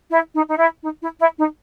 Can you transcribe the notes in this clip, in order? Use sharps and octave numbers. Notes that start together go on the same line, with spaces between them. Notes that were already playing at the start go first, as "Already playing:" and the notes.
E4
D#4
D#4
E4
D#4
E4
E4
D#4